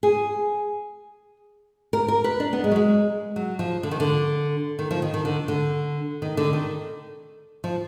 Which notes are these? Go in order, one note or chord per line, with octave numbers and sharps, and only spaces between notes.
G#4
A#4
A#4
B4
D4
B3
G#3
F#3
G#3
F#3
F3
D3
D#3
D3
D#3
F3
D#3
D#3
D3
D3
D#3
D3
D#3
F3